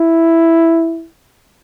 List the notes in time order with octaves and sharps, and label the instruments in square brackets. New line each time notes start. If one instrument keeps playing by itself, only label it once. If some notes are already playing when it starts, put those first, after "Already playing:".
Already playing: [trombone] E4